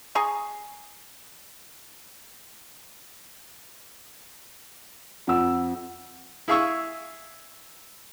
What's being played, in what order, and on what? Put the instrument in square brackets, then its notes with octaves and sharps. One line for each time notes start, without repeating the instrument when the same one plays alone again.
[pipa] G#4 G#5 A#5 C#6
[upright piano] F2 E6 [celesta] F4 F#5
[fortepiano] E4 G#4 F5 G#5 C#6 E6